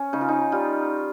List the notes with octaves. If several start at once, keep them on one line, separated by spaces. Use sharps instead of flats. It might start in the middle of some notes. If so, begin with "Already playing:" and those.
Already playing: C#4
C#3 D#4
F4
D#4
G3 F4